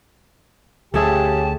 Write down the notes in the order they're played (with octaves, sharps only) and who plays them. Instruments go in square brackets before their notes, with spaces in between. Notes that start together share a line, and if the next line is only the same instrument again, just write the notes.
[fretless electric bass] D2 [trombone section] C#3 G4 [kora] A3 G#4 E5 [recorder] A5